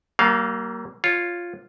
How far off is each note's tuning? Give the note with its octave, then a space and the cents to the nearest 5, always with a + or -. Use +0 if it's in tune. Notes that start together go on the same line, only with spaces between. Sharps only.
G3 -45 A#3 +0 F5 +0
F4 +0 C#5 -10